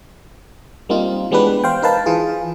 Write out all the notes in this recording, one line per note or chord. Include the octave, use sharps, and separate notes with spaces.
G3 A#3 C4 D#4 F4
E3 G#3 B3 D4 G4 B4
C5 F5 G5
D#4 A#4 B4 F5 A5
E3 F4 G#4